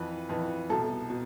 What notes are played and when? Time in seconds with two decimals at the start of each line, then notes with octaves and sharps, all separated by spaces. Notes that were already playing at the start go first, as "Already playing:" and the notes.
Already playing: F2 E3 B4
0.29 F2 E3
0.70 C2 B2 A4
1.10 B2